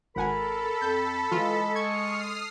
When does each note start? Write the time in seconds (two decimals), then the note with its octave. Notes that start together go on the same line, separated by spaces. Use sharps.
0.16 G#1 A4 A#4 F#5 G#5 B5
0.81 F2 G6
1.31 E3 G#3 F4
1.75 C#6 D#6 F6 G#6 C7